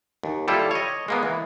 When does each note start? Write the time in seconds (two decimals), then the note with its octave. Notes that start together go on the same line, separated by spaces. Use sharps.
0.23 D#2
0.48 G3 E4 F4 A4
0.71 C#5 D#5
1.08 G#3 A#3 B3
1.23 E3